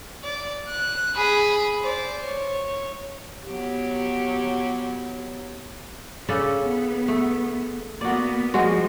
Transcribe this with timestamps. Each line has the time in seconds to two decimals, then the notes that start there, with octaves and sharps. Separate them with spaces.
0.23 D5
0.68 F#6
1.16 G#4 B5
1.81 C5 D5
2.26 C#5
3.46 F#3 B3 G4
6.29 C#3 C#4 D4 A4
6.64 B3
7.08 A3
8.01 A#3 B3 F#4 D5
8.54 F3 G3 G#3 F#4